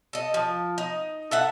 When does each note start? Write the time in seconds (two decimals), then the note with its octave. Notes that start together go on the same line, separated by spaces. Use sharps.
0.13 A4 D#5
0.34 F3
0.78 D#4
1.31 A4 E5 F#5